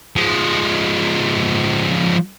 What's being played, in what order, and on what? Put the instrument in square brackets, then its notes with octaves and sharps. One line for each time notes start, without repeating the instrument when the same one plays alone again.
[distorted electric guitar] F3 G#3